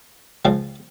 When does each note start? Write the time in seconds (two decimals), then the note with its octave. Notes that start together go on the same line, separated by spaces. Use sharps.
0.45 C#2 C#3 F3